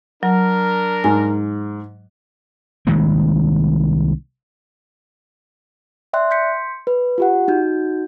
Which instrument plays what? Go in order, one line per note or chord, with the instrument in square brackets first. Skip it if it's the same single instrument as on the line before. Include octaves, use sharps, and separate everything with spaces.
[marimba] F#3 [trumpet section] D4 A#4
[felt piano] G#2 [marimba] G#5
[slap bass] C2 D#3 G#3 A#3
[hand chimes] D5 E5 G5 C6 F#6
C6 G6 B6 C#7
B4
F4 G4 F#5
D#4 F#4 G6